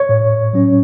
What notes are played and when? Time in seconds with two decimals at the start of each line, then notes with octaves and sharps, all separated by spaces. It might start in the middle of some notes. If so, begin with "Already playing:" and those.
Already playing: C#5
0.09 A2
0.53 F#3 C#4